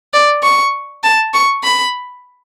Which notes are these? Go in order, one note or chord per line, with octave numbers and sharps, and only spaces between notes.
D5
C#6
A5
C#6
B5